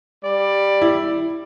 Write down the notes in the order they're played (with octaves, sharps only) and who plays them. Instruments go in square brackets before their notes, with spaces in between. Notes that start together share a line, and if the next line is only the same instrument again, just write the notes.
[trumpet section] G3 D5
[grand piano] E4